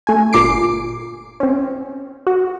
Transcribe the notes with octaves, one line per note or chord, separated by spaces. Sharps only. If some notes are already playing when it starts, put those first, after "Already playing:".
A3 G#5
G1 A#2 D6 C7 D7
C4 C#4
F#4